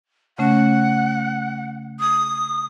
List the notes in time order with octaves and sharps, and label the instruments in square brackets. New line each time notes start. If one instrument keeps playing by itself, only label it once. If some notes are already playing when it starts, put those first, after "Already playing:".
[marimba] C#3 A3 C#4 [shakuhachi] F#5
[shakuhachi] D#6